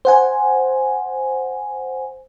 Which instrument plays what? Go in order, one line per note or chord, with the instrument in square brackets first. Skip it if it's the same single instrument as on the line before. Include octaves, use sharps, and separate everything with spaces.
[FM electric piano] C5 F#5 G#5